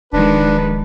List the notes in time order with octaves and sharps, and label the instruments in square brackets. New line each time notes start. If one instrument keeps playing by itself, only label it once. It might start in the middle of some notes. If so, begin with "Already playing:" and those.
[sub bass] D1 [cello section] D#3 F3 G#3 [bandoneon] D4 [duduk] B4